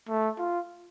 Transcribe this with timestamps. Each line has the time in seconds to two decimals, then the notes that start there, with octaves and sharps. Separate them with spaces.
0.09 A3
0.38 F4